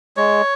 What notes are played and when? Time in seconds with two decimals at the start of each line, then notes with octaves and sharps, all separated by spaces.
0.17 G#3 C#5